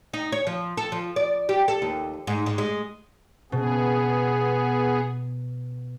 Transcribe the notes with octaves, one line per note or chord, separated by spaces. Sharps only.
D#4
C#5
F3
A4
F3
D5
G4
A4
D#2
G#2
G#2
G#3
B2 B3 G#4